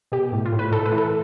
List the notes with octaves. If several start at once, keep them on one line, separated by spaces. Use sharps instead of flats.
B2 G4
A2
F4
A2
B4
A2 A4
B4
E3
A4